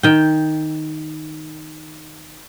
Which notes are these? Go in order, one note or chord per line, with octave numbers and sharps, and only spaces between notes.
D#3 G5